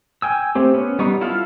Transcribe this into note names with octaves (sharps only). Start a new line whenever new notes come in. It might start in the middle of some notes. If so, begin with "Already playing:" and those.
G5 G#5 E6
A3 C4 G4
B3 C#4
G3 B3 D#4 C#6
E4 F4 A4 F5